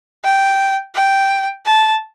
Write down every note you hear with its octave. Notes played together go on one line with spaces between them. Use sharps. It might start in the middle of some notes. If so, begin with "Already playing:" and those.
G5
G5
A5